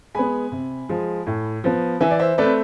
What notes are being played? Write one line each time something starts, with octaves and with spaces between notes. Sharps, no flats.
G#3 B3 G#5 B5
C3
F3 G#3
A2
F3 B3
E3 E5 G#5
D5
C5 E5
A3 C4 B4 D5